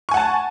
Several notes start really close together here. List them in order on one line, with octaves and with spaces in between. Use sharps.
C#6 G#5 F#5 A5